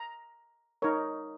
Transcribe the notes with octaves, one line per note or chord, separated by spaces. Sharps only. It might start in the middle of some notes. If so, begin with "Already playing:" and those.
Already playing: A#5
D#4 A#4 C#5